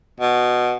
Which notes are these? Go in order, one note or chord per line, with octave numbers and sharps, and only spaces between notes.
B2